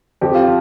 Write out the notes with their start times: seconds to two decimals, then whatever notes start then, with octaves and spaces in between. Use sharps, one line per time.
0.21 F2 G4
0.35 F4